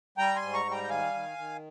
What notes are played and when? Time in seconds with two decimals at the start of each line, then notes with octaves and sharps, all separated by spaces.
0.18 G3 G5 A#5
0.36 G#5 C6
0.42 G#2
0.54 A#5 C#6
0.66 G3
0.71 G5 A#5
0.84 G5
0.89 D#3 F5 G#5
1.14 D#3
1.38 D#3